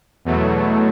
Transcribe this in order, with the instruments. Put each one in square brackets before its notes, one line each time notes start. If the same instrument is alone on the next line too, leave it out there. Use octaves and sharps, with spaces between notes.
[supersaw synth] E2 B2 F#3 A3